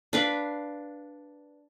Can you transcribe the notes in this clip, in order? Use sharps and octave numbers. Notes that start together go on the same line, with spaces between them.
D4 B4 F5